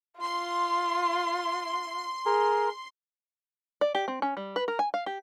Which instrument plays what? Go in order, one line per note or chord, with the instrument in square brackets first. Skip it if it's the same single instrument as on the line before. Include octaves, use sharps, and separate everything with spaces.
[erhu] F4 [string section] C6
[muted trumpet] G#4 [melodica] A#4
[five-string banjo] D5
G4
C4
C#4
G3
B4
A#4
G#5
F5
G4